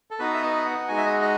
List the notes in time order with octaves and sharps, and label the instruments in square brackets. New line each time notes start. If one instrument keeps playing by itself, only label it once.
[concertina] A4
B3 D#4 F#4 B4
E5
D#5
F#5
G#3 D#4 F#4 G#5
E5
D#5
D#5